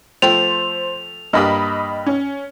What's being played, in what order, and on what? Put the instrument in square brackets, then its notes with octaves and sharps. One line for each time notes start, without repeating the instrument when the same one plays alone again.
[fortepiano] F3 A3 G5 [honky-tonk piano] C5 [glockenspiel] F7
[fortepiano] G2 A#3 G4 [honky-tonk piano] D#5 B5 D#6
[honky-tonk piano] C#4